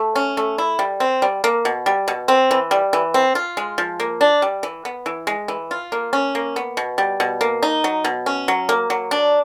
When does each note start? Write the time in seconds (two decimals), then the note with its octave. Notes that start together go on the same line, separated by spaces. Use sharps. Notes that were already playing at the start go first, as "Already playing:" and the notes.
Already playing: A3
0.15 C#4
0.37 A3
0.58 E4
0.79 G3
1.00 C4
1.22 G3
1.44 A#3
1.65 B2
1.86 G3
2.08 B2
2.28 C4
2.51 E3
2.71 G3
2.93 E3
3.14 C4
3.35 F4
3.57 G#3
3.78 F3
4.00 A#3
4.21 D4
4.42 G3
4.63 E3
4.85 B3
5.06 E3
5.27 G#3
5.48 E3
5.71 F4
5.92 A#3
6.13 C#4
6.35 A#3
6.56 B3
6.77 B2
6.98 G3
7.20 B2
7.41 A#3
7.63 D#4
7.84 F#3
8.04 B2
8.26 C#4
8.48 F#3
8.69 A#3
8.90 F#3
9.11 D4